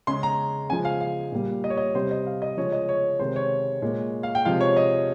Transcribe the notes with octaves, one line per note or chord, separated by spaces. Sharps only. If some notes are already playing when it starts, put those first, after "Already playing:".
C#3 G#3 C6
A#5
C#3 F3 G#3 G#5
F5
F5
A#2 G3
D#5
C#5
D#5
C3 G3 C5
D#5
F5
D#5
C#3 F3 G#3 C#5
D#5
C#5
C3 D#3 G#3 C5
C#5
A#2 G#3
F5
G5
C3 F3 G#3 F5
C#5
D#5